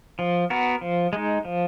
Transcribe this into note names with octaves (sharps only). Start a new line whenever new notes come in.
F3
B3 F#4 A#4
F3
G#3 D#4
F3